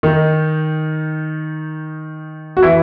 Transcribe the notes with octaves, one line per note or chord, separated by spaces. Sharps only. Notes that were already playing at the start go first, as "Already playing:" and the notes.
D#3 D#4
F#4
E3 E4